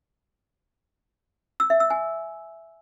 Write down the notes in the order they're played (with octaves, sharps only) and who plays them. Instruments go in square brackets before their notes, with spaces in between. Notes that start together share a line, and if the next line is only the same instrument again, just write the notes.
[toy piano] E6
E5
E6
G#5